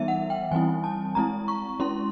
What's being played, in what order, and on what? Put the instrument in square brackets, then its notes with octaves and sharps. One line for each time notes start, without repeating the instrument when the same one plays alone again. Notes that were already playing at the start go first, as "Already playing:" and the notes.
Already playing: [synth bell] E3 G3 B3 D#4 E5
F#5
G5
E3 G3 C4 E4 G#5
A5
G#3 C4 E4 A#5
C#6
G#3 C#4 E4 C6